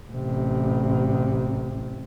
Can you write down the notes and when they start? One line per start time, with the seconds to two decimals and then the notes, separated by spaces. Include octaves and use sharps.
0.11 A1 C3